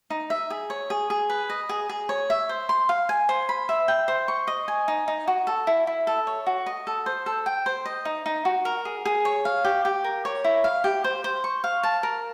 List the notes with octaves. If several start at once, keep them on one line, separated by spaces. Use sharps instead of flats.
D#4
E5
G#4
C#5
G#4
G#4
B4
D#5
G#4
G#4
C#5
E5
C5
C6
F5
G#5
C5
B5
E5
G5
C5
C#6
D#5
G#5
D#4
D#4
F#4
A4
E4
E4
A4
C#5
F#4
D#5
A4
C5
A4
G5
C5
D#5
D#4
D#4
F#4
A#4
G#4
G#4
C#5
F5
G4
G4
A#4
C#5
E4
F5
G4
C5
C5
C#6
F5
A5
A#4